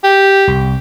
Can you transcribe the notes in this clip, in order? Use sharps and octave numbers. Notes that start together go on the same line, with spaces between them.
G4
C2